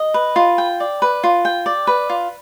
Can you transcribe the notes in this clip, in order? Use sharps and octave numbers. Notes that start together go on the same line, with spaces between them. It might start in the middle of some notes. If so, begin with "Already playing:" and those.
Already playing: D#5
B4
F4
G5
D5
B4
F4
G5
D5
B4
F4